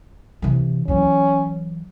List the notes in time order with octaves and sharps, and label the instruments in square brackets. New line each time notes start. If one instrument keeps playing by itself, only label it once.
[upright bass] C3 E3
[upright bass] E3 F#3 [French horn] C#4